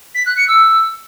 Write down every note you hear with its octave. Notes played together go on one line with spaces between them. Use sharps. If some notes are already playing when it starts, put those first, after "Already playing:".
B6
F#6
C#7
E6